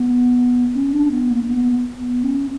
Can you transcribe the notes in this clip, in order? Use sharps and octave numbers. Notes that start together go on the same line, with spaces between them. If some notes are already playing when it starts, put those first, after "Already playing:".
Already playing: B3
C#4
D4
B3
A#3
B3
B3
C#4